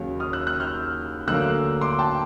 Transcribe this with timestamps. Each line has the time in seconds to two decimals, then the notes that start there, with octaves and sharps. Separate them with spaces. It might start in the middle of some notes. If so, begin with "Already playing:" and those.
Already playing: D#2 C#3 F#3 A#3
0.20 D#6 F6
0.33 E6 F#6
0.47 E6 F#6
0.60 F6 G6
1.28 D2 D3 F#3 A#3 E6 F#6
1.81 C6 D6
1.99 G5 A5